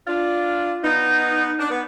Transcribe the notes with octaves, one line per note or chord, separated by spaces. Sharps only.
D4 F4
B3 D#4
D4
B3